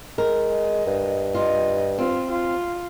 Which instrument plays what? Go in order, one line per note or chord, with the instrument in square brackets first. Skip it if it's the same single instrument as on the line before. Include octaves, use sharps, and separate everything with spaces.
[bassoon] G#3 [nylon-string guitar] A#4
[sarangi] D#5
[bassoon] G2
[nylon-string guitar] F4 [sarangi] D#5
[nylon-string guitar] C4 [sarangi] F4
[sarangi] F4